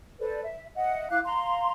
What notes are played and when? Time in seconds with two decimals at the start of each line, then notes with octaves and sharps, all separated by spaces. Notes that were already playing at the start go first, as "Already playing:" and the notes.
0.19 A4 B4 C5 D5
0.43 E5
0.76 D#5 E5 F#5
1.10 E4 F5 D6 F#6
1.25 F5 A#5 C6